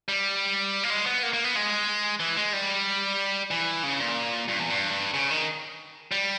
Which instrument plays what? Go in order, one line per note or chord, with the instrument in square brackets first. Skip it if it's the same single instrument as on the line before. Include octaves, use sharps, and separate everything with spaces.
[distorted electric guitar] G3
A#3
G#3
B3
A#3
A#3
B3
G#3
E3
G#3
G3
E3
C#3
A#2
G2
E2
G2
C#3
D#3
G3